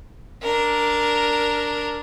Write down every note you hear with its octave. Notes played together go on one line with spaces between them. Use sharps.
D4 A#4